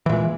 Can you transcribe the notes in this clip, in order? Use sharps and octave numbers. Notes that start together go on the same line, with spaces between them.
A#2 E3 G#3